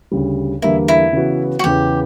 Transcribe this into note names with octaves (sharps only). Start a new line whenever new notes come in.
D2 C#3 G3
E2 D3 G3 A#3 E4
E4
C#3 E3 B3 F#4
F#4
E2 C#3 E3 G4